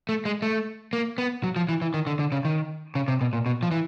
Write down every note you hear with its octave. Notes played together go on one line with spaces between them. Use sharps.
A3
G#3
A3
A#3
B3
F#3
F3
E3
E3
D#3
D3
D3
C#3
D#3
C#3
C3
B2
A#2
B2
F3
E3